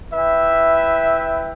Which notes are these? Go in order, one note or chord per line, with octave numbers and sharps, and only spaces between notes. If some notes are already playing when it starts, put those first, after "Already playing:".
E4 B4 E5 G5